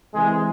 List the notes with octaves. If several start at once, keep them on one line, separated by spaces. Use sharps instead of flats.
C3 E3 G#3